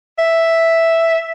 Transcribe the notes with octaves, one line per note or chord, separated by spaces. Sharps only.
E5